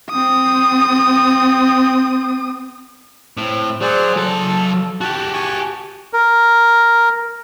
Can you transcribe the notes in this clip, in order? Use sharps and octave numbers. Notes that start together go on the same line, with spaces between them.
C4 D#6
A2 C4
F#3 G#4 C5 D5
F#3 A4 A5
F#4 G4 A5
G#5 A5 C#6
A#4